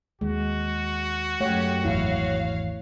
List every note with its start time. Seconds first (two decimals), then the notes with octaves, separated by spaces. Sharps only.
0.21 D#2 G#3 F#4
1.40 F#2 A3 G4 C#5 F#5
1.85 G#1 E2 E4 C#5 F5